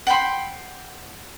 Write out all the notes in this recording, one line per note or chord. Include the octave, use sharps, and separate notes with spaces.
F#5 G5 B5 C6